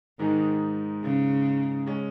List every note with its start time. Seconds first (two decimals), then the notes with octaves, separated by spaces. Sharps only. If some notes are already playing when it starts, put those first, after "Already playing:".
0.19 G#2 D#3 G#3 D#4
1.03 C#3
1.86 G#3 C#4